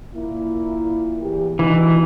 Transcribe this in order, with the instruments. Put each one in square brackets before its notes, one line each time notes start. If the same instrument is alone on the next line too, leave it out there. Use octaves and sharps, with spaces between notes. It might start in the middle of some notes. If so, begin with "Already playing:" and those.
[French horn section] A#2 A#3 E4
E2 E3 G4
[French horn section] B2 D4 D#4 [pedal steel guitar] E3